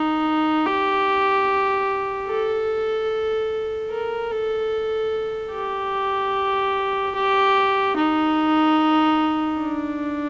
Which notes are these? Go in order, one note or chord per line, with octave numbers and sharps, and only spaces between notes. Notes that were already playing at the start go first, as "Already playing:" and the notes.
Already playing: D#4
G4
A4
A#4
A4
G4
G4
D#4
D4